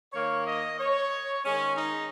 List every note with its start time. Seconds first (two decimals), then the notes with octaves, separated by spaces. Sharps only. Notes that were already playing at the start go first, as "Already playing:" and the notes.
0.13 D#3 A#3 C#5
0.46 D#5
0.79 C#5
1.44 D#3 G#3 C#4
1.77 D#4